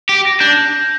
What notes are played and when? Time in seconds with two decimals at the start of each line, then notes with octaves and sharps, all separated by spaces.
0.09 G4
0.25 A#6
0.40 D4 G6